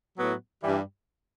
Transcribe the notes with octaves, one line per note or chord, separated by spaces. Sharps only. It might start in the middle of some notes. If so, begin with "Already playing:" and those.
A2 F#3 B3 F#4
G2 E3 G3